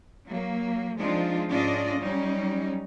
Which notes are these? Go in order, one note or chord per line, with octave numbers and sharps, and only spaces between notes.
F#3 A#3
F3 G#3 C4 D4 D#4 F4
G#2 C#4 D4 F4 D5 D#5
F#3 G3 C#4 D#4